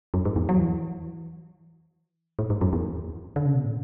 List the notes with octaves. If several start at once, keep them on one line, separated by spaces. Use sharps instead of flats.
F#2
G#2
E2
F#3
E3
A2
G#2
F#2
E2
D3
C#3
B2
A2